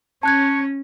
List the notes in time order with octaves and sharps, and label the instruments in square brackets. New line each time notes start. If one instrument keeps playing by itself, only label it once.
[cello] C#4 [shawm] C#5 [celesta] A5 F#6 G#6